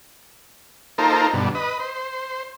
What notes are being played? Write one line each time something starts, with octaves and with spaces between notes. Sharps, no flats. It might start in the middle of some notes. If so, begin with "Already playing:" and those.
A#3 D#4 F4 A4 A#4 C5
G2 B2 D3
B4 D#5
C5